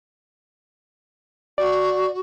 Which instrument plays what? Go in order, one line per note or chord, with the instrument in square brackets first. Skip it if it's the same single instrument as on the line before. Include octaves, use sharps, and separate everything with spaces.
[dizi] F#4 [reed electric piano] D5